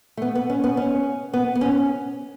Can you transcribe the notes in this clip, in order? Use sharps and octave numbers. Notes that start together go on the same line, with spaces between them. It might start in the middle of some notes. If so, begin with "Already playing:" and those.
A3
B3
B3
C#4
B3
C#4
B3
B3
C#4